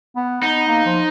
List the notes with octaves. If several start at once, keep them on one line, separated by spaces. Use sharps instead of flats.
B3
B3 D#4
A#3
F3